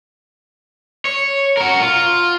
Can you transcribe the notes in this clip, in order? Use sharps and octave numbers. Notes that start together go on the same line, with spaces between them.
C#5
F#4 A#4
F4